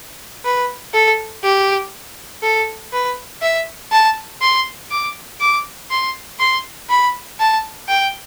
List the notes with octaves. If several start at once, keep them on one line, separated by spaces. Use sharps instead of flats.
B4
A4
G4
A4
B4
E5
A5
C6
D6
D6
C6
C6
B5
A5
G5